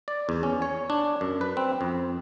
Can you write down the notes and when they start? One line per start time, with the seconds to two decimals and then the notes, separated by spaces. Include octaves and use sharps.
0.08 D5
0.29 E2
0.43 C#4
0.62 C#5
0.90 D4
1.21 F#2
1.41 B4
1.57 C4
1.81 F2